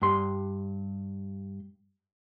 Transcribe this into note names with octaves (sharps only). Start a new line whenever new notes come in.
G2 C6